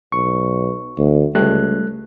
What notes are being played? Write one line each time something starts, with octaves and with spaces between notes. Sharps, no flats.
B1 C#6
D2
C#2 G3 A3 F#6